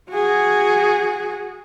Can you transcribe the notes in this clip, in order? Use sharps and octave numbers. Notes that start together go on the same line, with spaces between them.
F#4 G#4